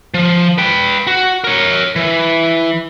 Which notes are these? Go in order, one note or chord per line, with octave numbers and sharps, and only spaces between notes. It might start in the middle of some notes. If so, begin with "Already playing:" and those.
F3
B4 G5
F#4
A#4 C#5
E3